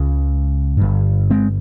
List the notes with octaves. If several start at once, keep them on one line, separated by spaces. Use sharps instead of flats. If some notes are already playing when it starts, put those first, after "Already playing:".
Already playing: C#2 C#3
G1 G2
G#3 C4